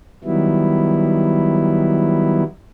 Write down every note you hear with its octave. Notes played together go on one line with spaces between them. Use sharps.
D#3 F#3 G3 B3 E4